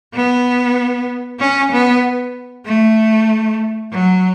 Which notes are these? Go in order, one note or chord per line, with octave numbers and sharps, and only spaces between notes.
B3
C#4
B3
A3
F#3